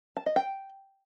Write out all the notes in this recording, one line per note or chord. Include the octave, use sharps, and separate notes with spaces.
A5
D#5
G5